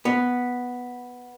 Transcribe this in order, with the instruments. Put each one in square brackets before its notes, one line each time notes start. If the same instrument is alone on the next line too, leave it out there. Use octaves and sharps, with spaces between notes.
[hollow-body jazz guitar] B3